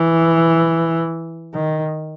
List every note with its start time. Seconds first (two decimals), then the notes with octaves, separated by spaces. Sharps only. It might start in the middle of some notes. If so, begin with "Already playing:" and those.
Already playing: E3
1.54 D#3